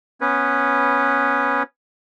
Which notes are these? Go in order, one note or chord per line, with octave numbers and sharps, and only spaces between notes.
B3 C#4 B4